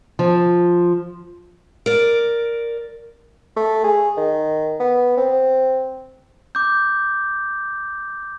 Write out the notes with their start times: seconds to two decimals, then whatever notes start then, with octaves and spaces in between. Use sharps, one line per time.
0.19 F3
1.86 A#4 D5
3.57 A3
3.84 G#4
4.17 D#3
4.80 B3
5.17 C4
6.55 D6 G6